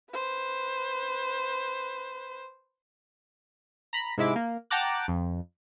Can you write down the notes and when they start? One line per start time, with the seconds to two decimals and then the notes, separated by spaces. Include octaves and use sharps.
0.12 B4 C5
3.93 A#5 B5
4.17 G#2 C3 G#3 E4 E5 D6
4.36 A#3
4.70 F#5 G5 A5 A#5 D6 F#6
5.08 F2